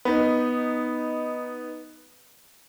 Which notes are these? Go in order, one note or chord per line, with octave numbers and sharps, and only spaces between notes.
B3 D#4